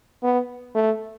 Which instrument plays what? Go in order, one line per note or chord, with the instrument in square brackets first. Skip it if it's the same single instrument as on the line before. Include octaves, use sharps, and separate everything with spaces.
[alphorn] B3
A3